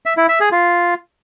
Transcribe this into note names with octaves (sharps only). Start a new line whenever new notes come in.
E5
E4
E5
G#4
F4